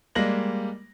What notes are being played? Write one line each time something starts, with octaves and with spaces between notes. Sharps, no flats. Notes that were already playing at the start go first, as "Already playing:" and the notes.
G3 G#3 A#3 A#6 F#7